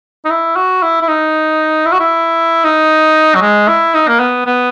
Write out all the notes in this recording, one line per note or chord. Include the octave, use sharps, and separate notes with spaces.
D#4
E4
F#4
E4
E4
D#4
E4
F#4
E4
D#4
F#3
G#3
E4
D#4
A#3
B3
B3